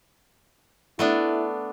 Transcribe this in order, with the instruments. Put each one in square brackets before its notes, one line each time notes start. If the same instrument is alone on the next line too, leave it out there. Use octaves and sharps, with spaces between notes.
[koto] A3 B3 D4 [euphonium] E4